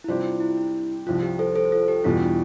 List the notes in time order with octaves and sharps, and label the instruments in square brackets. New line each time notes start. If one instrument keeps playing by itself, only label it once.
[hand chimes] E4
[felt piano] C3 G3 D4 G4 C5 [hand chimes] F4
[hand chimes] F4
E4
E4
E4
[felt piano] C2 C3 F3 [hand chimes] F4
[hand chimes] G4
A4 C5
A4 C5
F4 A4
G4
[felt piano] E2 B2 G3 [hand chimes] F4
[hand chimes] D4